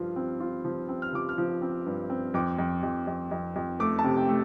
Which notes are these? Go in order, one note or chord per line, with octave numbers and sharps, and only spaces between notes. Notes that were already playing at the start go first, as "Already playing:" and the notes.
Already playing: G2 F3 F4
C4
F4
F3
C4
F6
F3 D6
F6
F3
C4
G2
C4
F2 D6
F2
F2
F2
F2
F2
A3 D6
A5
C3
G5
A3